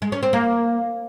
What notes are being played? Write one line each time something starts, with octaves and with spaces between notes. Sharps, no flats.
G#3
C#4
C4
A#3